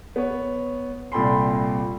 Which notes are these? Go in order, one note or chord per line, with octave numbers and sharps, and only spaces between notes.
B3 C#5
C2 A#2 A4 G5 B5 C6